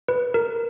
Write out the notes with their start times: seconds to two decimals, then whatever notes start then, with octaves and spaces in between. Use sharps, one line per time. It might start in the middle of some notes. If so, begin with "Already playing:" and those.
0.08 B4
0.34 A#4